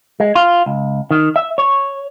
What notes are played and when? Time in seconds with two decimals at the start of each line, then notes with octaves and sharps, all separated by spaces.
0.20 G#3
0.35 F4
0.66 C#2
1.11 D#3
1.36 E5
1.58 C#5